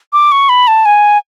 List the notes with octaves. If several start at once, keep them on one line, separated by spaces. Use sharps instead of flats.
D6
C#6
B5
A5
G#5